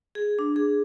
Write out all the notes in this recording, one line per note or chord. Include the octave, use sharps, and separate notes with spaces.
G#4
D4
G#4